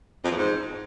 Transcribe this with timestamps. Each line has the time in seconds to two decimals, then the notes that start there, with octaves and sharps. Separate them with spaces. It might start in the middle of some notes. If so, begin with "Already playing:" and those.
0.24 F2
0.31 E2
0.37 G#2